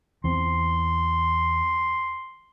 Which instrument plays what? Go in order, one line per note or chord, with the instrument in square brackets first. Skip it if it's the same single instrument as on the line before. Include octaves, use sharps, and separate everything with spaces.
[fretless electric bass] E2 C4 [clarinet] C6